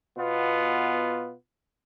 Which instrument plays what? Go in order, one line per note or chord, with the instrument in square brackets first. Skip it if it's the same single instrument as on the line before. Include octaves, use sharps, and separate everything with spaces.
[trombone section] B2 B3 F4